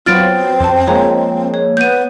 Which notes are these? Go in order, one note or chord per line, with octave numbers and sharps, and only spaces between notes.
F#3 B3 C4 F4 F6 A6 D7
F2 C5 A5
F3 G#3 A#3 C5 C#5 A#5
C#5
B3 G6 D#7